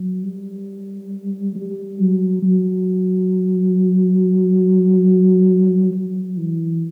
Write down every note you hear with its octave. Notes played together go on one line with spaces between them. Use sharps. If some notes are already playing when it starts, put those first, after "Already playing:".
Already playing: F#3
G3
G3
F#3
F#3
F#3
E3